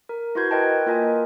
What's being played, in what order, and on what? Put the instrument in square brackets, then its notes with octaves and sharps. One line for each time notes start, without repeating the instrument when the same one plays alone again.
[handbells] A#4
E4 F#4 B4 C6 G6 G#6
A#4 B4 D#5 G5 A5
A#3 F4 A#4 D#5 G#5